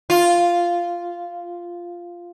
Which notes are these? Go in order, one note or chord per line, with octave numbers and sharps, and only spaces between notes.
F4